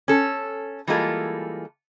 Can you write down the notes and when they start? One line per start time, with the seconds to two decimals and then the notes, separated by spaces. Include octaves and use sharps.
0.08 C#4 A4
0.87 E3 G3 G#3 A#3 F4 A4